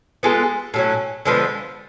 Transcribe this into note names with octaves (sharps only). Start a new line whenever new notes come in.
G#3 B3 F4 A4
A2 F#3 C#4
D3 F3 G#3 B3